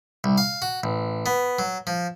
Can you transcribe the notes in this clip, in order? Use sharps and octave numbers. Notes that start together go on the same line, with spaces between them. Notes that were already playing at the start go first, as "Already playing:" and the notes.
C2
F5
F#4
A1
B3
F#3
F3